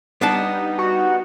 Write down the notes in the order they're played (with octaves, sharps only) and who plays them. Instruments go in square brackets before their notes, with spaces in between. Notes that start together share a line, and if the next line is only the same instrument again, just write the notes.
[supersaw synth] G3 D#4 [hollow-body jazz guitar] B3 D4 A5
[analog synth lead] F#4